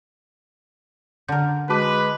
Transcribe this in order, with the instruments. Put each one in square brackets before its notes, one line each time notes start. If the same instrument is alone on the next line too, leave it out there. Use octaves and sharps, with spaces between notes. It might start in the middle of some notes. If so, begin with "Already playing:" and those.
[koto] D3 A#4 [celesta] G6
[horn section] G#3 B4 [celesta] F#4 A5 D6